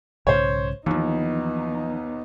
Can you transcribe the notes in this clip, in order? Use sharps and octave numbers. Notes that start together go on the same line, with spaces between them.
B1 G#2 C#3 C5 C#5
D#2 E3 F3 B3 D#4